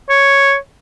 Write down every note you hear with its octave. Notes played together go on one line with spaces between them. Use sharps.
C#5